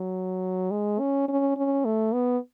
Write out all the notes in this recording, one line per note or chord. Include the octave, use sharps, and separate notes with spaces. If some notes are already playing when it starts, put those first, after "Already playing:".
Already playing: F#3
G#3
C#4
C#4
C#4
A3
B3